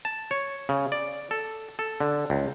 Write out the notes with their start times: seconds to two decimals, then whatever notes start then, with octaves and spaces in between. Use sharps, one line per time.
0.05 A5
0.31 C#5
0.69 C#3
0.92 D5
1.31 A4
1.79 A4
2.00 D3
2.30 C#2